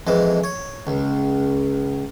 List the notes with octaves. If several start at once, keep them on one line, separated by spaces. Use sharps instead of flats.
F2 E3 G#3
C#5
C#2